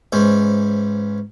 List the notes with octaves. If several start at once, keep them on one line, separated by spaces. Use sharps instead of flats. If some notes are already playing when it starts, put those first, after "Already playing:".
G#2 E3 G#3 C#4 C5